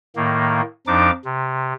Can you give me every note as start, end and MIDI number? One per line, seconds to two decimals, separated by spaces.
0.16 0.61 45
0.16 0.61 51
0.16 0.61 58
0.87 1.11 41
0.87 1.11 53
0.87 1.11 62
0.87 1.11 63
0.87 1.11 86
1.25 1.73 48